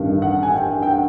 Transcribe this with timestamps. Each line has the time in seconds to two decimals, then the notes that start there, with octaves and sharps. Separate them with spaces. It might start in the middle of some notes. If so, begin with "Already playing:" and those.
Already playing: A1 G2 D#3
0.22 F#5
0.43 G#5
0.54 G5
0.83 G5
0.88 F#5